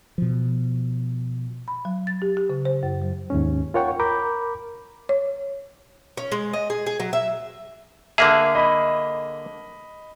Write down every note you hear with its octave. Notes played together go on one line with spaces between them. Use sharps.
B2 F3
B5
F#3
A6
G4
G4
C#3
C5
F#2
F#3
D#2 G#2 C#4
F4 A#4 C#5 F#5 G5 C#6
A#4 A#5 B5 D6 G6
C#5
C#4
G#3
D#5
G#4
G#4
F#3
E5
D3 A#3 G#4 E5
D#5 B5